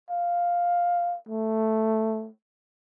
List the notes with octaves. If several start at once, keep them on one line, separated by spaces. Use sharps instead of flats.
F5
A3